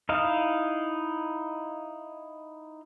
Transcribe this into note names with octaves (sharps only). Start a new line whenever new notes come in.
D#4 E4 D#5 F5